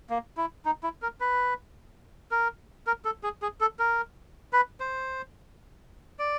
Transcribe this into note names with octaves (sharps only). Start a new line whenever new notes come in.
A#3
E4
D#4
E4
A#4
B4
A#4
A#4
A4
G#4
G#4
A4
A#4
B4
C5
D5